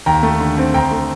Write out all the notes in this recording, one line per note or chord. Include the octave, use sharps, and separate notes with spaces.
D#2 G5 A#5
A3
D3
C4
D2 G5 A#5
A3